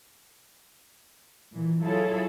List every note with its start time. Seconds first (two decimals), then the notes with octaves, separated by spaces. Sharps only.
1.53 A#2 E3
1.84 F#3 E4 F4 G#4 A4 C#5